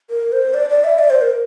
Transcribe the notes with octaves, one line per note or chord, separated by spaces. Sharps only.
A#4
C5
D5
D5
E5
D5
C5
A#4